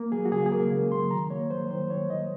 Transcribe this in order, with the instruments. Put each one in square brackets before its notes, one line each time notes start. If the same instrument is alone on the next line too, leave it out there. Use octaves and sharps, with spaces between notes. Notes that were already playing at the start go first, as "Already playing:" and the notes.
Already playing: [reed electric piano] A#3
F#3 G#4
F#4
C#3 G#4
G#4
A#3 A#4
C#3
F#3 C6
D#3 A#5
A#3 C#5
F#3 C5
D#3 C5
D#3 C#5
D#3 D#5